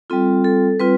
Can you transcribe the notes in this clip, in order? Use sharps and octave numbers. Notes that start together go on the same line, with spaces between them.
G3 C4 F4 A4
A4
G3 C4 F4 B4